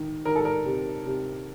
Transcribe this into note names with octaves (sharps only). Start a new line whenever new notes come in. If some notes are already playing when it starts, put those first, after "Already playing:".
Already playing: D#3
D#3 A#4
A4
A#4
C3
C3